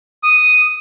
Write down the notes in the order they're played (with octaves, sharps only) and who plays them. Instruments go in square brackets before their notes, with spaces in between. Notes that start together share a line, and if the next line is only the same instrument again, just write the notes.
[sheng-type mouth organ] D#6